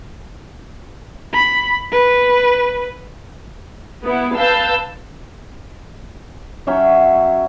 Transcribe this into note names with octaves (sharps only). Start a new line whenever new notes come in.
B5
B4
B3 E4
B4 F5 A5 E6 G6
F#3 C#4 E5 G5